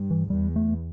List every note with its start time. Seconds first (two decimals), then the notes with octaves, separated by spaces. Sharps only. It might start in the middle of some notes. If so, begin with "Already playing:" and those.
Already playing: G2
0.11 E3
0.30 E2 G3
0.56 A3